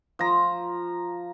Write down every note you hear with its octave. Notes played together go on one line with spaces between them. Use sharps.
F3 A#5